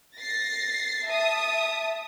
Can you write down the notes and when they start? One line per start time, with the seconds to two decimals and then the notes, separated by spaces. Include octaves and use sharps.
0.16 A6 A#6 C7
1.06 E5 A5 D#6